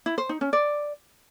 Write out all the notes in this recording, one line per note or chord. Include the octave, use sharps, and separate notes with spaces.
E4
C5
D#4
C#4
D5